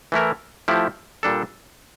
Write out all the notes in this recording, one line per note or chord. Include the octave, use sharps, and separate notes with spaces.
E3 A3 E4 A#4
F3 A3 E4 G4
A#2 G3 D4 A4